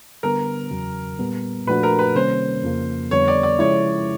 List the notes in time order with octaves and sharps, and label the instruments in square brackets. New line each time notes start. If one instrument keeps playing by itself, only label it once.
[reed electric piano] D3 G3 B3 [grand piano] A#4
[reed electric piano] E2 C#3 F#3
A#2 G3 B3
[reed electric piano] A#2 F3 A3 D4 F#4 [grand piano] B4
[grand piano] A#4
B4
[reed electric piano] C3 D#3 G3 A#3 C#4 [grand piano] C5
[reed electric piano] F2 C#3 F3 A#3
[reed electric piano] F2 D3 G3 B3 [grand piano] C#5
[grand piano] D5
D5
[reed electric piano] C#3 F3 G#3 C#4 E4 [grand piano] C#5